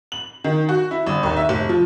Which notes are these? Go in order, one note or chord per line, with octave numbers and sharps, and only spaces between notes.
F#7
D#3
F#4
E4
G1
D#2
E5
F1
F3